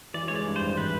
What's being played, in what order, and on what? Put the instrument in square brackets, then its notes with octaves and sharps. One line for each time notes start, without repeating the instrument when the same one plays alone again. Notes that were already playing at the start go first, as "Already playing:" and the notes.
[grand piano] E3 [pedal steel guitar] D5
[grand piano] G#3 [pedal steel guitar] C#5
[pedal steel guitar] D5
[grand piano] G2
[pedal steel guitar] C5
[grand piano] G#1
[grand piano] E3 [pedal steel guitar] B4